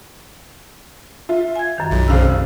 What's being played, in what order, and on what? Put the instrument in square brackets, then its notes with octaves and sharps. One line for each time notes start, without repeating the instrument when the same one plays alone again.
[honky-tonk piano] F4 E5
[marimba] G#5 G#6
F#2 D#3
[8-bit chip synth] B1
[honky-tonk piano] F1 C#3 [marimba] C5 F5 E6